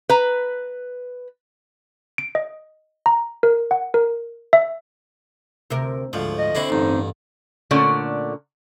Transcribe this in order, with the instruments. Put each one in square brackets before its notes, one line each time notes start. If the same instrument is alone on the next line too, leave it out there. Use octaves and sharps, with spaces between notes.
[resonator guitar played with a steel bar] B4 A#5
[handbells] D7
D#5
A#5
A#4
F#5
A#4
E5
[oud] D2 C3 A#4
[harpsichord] D2 F3 [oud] G#2
[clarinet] D#5
[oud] D3 C4 [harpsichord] D4 E4 F#4
[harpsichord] A1 G2 [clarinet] D#4
[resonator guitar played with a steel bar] A#2 D3 A3 C#4 D5